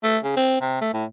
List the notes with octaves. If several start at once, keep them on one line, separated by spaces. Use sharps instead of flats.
A3
C#3
C4
C3
A3
A2